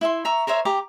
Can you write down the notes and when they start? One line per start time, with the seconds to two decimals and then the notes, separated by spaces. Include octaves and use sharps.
0.01 E4 E5 C6
0.25 E5 A#5 C#6
0.47 A#4 C5 C#5 E5
0.65 G4 A#5 D6